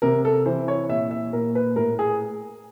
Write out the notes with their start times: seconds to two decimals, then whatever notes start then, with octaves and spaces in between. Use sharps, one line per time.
0.02 C3 A#4
0.25 A4
0.46 E3 C5
0.68 C#5
0.89 A#2 E5
1.11 E5
1.33 A#2 A#4
1.55 B4
1.76 A2 A#4
1.99 G#4